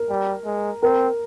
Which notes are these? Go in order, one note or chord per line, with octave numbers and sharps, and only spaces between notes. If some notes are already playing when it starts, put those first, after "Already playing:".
Already playing: A#4
G3
G#3
C4 A#4